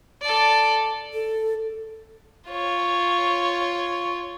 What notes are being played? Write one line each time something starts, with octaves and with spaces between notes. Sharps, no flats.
A4 D5
A4
F4 C#5